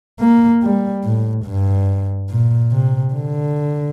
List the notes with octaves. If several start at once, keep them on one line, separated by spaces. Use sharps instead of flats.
A#3
G3
A2
G2
A#2
C3
D3